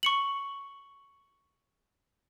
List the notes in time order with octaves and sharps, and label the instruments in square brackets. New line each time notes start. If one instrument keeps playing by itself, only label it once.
[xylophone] C#6 C#7 F#7